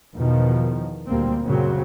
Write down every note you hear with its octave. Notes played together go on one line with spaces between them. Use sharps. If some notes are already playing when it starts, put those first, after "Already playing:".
E2 B2 D#3 F3
D2 A#2 G3 A#3 C4
F#2 A#2 C#3 F#3 C4